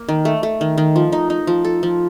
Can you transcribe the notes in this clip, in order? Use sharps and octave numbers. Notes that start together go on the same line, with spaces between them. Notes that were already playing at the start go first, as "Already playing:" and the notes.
Already playing: A#3
D#3
A3
A3
D#3
D#3
F3
D#4
D#4
F3
A4
F3